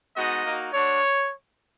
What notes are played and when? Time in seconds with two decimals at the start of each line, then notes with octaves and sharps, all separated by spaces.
0.16 G#3 B3 D#4 F#4 D#5
0.45 A#3 D#4 F#4
0.73 A3 D4 F#4 C#5